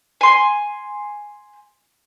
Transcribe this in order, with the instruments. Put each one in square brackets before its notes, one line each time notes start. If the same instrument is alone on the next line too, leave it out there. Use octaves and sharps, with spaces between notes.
[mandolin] G#5 C6